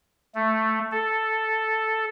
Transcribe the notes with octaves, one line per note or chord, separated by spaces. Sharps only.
A3
A4